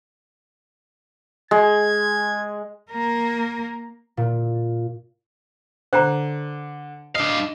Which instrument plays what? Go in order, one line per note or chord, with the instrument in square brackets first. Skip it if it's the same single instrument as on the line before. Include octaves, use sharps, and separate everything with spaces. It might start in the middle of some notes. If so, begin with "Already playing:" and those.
[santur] G#3 [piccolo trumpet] G#6
[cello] A#3 A#4
[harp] A#2
[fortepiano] D3 [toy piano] C5 G5 A#5
[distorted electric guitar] D4 F5 [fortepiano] D#5